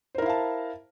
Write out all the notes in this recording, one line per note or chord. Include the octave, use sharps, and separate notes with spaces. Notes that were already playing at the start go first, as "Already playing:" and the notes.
E4 A#4 C5 F5 A5